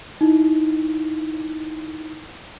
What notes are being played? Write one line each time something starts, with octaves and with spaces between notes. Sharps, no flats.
D#4 E4